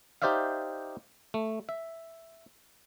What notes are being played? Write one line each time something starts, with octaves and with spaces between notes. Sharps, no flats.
D#4 G4 C5 D5 E5 F5
A3
E5